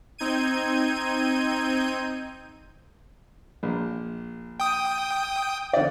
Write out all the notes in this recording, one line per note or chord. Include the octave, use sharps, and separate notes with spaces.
C4 D#4 G6 G#6 D#7
A#1
G5 D#6
D3 D5